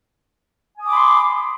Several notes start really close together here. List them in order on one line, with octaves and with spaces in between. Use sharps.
G#5 D#6 D6 B5 C6